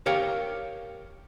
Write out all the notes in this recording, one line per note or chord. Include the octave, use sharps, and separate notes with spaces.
G4 A#4 C#5 F5 G5